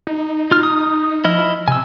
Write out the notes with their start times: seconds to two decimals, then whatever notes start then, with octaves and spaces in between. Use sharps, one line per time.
0.07 D#4
0.51 F4 F6
0.63 D#6
1.24 F3 E4 D#5 F6
1.68 C3 G#5 E6